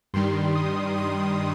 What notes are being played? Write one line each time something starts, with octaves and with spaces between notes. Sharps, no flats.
G2 D#3 G3 C6
D#6
C6